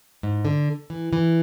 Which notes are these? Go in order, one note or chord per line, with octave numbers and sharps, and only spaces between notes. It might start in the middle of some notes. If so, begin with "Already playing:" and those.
G#2
D3
E3
E3